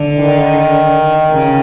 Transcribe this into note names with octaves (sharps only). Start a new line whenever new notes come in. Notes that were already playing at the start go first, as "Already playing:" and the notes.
Already playing: D3
D#3
C#3